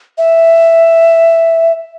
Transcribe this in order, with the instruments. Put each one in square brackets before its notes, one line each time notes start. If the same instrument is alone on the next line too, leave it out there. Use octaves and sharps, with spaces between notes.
[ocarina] E5